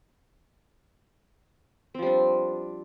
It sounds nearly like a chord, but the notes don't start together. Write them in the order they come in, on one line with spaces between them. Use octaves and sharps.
C4 F3 G3 D4